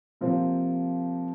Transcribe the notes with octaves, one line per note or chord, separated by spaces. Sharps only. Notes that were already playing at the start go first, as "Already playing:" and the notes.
C3 F3 A#3 C4 F4